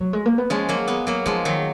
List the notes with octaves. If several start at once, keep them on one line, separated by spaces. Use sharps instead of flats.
F#3
G#3
A#3
B3
F3 G#3 C#4
F#3 A#3
G#3 B3
F#3 A#3
F3 G#3 D#4
D#3 F#3